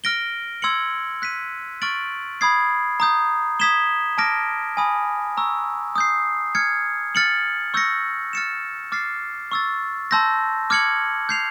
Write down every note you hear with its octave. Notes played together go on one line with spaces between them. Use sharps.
F6 A#6 D7 G7
C6 E6 G#6 C#7 F#7
F#6 B6 D#7
C#6 F6 A6 D7 F#7
B5 D#6 G#6 C7
A#5 D#6 G6
D#6 G#6 B6 E7 G7
A5 D6 F6 A#6 D7
G#5 B5 D#6
A#5 C#6 E6
D#6 G6 C7
F6 G#6 C#7
F6 A6 C#7 F#7
C#6 E6 G6 A#6 C#7
F6 A6 C#7 E7
D6 F6 A6 C7
C#6 E6 A6
A5 C6 E6 G6 A#6
D6 F6 G#6 C#7 F#7
G6 C7 F7